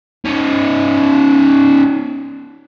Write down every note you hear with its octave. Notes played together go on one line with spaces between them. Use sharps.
C#4 D#4